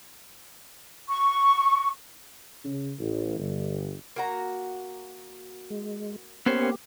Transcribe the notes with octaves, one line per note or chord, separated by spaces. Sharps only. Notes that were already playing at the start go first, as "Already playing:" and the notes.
C#6
C#3
A1
G1
A#3 F#4 A#5
G#3
A#3 B3 C#4 G4 C5